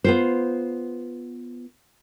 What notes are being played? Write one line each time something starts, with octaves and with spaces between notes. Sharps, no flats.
B3 F4 C5